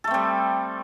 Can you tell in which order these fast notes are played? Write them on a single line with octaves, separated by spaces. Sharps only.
A4 A3 C4 G3